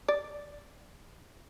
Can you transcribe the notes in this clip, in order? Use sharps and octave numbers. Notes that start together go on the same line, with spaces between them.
D5